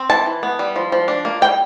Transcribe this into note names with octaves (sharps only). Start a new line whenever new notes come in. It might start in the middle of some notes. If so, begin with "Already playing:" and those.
Already playing: C4
E3 A5
E3
B3
G3
F3
F3
D4
A#3
G3 G5